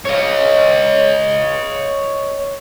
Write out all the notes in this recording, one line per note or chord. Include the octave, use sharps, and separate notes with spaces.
C#5 D#5